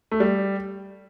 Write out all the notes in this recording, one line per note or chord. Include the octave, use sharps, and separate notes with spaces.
A3
G3